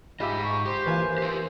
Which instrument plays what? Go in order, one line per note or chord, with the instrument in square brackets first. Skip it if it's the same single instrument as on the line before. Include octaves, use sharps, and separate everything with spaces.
[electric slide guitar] G#2 D#5 [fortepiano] F4 G4 E5 [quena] B5
[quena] C#6
[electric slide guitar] G4 [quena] C5
[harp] E3 A#3 G#5 [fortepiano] F4 B4
[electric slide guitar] G4 A#4